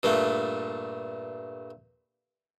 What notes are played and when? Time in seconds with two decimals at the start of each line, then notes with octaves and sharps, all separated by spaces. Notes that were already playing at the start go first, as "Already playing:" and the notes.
0.03 G2 A#2 A3